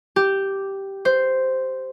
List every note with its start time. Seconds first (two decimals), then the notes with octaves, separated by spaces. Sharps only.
0.16 G4
1.05 C5